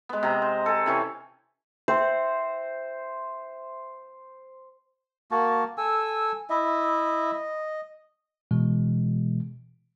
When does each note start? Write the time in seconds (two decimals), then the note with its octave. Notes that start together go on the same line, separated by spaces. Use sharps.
0.09 G#3 B3
0.23 C3 A#5
0.42 C5
0.66 A4 G#5
0.86 C3 E3 C#4
1.88 C5 E5 G5 C6
5.31 A#3 F#4 A5
5.78 A4 G#5 E6
6.50 E4 D#5 E5
7.32 D#5
8.51 B2 E3 G#3